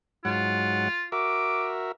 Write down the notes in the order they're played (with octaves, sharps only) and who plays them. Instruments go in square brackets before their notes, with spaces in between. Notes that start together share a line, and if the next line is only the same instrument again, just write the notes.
[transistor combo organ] G#2 F#3 F#5 [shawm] F4
[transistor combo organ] F#4 A#4 E5 [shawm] D6